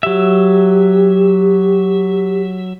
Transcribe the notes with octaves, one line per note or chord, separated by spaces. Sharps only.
F#3 G4 E5